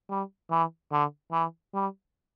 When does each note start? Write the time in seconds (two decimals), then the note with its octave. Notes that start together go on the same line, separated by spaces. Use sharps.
0.10 G3
0.51 E3
0.92 D3
1.32 E3
1.74 G3